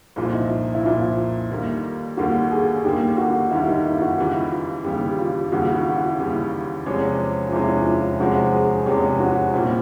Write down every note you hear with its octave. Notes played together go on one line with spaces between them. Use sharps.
C2 A#2 F3 F4
E4
D#4
E4
E4
C2 A#2 F3 F4
D#2 D3 G3 A#3
D#2 D3 G3 A#3 F#4
G#4
D#2 D3 G3 A#3 G4
F#4
D#2 D3 G3 A#3 E4
D#4
E4
F#4
D#2 C#3 E3 G3 F4
D#2 C#3 E3 G3 G4
F4
D#2 C#3 E3 G3 F#4
F#4
E4
D#2 C#3 E3 G3 E4
E2 C3 F3 G#3 C#4
F4
E2 C3 F3 G#3 C#4 E4
E4
F4
E2 C3 F3 G#3 C#4 F#4
G#4
E2 C3 F3 G#3 C#4 G4
F#4
A#2 G3 C4 E4 F4